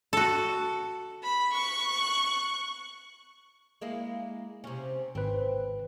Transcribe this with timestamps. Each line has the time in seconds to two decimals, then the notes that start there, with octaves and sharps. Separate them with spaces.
0.13 F#4 A4
1.23 B5
1.53 C#6 F#6
3.81 G#3 A#3 E4
4.64 C3 C#4
5.15 G#1 C4 B4